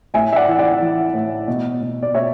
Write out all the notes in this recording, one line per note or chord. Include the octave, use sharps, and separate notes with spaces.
A2 E5 G#5
E5
D5 F#5
E3
D5 F#5
E3
A2
B2
B2
D5
B2 C#5 E5